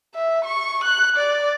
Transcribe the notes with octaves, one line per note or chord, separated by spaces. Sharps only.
E5
C#6
F#6
D5